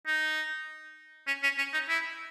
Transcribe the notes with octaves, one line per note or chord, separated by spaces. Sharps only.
D#4
C#4
C#4
C#4
D#4
E4